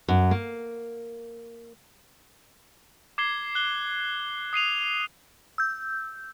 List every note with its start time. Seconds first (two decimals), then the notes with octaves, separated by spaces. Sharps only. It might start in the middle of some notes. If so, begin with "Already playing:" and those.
0.08 F#2
0.31 A#3
3.18 D6 G#6 C7 G7
3.55 F#6 G7
4.53 D#6 C7 D#7 F7
5.58 E6 G6